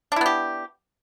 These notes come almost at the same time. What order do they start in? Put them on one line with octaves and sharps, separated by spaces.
D4 E4 B3 G4